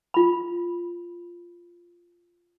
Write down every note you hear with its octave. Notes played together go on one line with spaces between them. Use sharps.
F4 B5